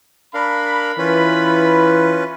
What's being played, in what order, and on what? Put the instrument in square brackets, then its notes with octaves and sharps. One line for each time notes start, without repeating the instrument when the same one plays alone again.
[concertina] D4 A#4 F5 [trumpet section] B5
[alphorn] E3 [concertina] C#4 F4 B4